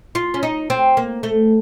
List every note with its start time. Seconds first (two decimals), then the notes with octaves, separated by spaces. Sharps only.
0.15 F4
0.34 C#4
0.43 D#4
0.70 C4
0.97 A#3
1.23 A3